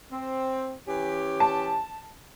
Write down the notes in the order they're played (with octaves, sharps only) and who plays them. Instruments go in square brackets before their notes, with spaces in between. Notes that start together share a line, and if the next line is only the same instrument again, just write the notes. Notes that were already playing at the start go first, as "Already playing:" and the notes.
[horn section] C4
E3 C#4 G4
[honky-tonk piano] A5